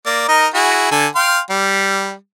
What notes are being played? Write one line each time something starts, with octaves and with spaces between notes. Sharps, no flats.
A#3 D5
D#4 A#4 D#5
E4 F#4 G#4
D3 A4 G#5
F5 G5 C6
G3